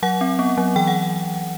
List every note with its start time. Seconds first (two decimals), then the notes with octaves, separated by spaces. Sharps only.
0.03 F#3 F#5
0.21 C4
0.39 B3
0.58 F#3
0.76 E3 G5
0.87 F#5